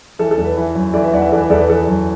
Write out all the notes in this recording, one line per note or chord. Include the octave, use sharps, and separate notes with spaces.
E3 A4
A4
E2
B4
E3
F#2
E3 A4 D5
B4 E5
E2 D5 F#5
B4 E5
E3 A4 D5
B4 E5
E2 A4 D5
B4
E3 A4
F#2